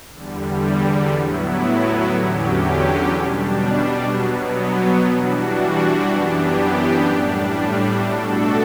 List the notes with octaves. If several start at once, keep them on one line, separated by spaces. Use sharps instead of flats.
E2 D3 G3
A2 F#3 B3 E4
E2 D3 F#3 C#4 G4
B2 G3 D4
B2 F#3 B3
E3 G3 D4 F#4
F#2 E3 B3 D4 G4
A2 G3 D4
B2 A3 D4 F#4 A4